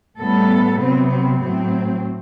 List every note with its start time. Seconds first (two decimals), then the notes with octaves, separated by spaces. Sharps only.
0.19 A2 G3 B3 A4
0.79 C3 F#3 B3 C4
1.09 C4
1.40 A2 F#3 C4